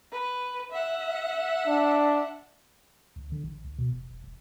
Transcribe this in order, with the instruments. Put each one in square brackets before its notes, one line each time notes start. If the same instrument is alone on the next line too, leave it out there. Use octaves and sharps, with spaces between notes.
[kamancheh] B4
E5 F#5
[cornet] D4
[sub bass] D2
D3
A1
D2
B2
E1
E1
E1